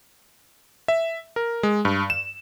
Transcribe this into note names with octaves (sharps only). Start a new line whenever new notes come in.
E5
A#4
G#3
G2
E7